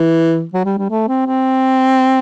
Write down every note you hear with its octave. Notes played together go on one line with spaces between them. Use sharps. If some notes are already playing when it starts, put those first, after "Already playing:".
Already playing: E3
F#3
G3
G3
A3
C4
C4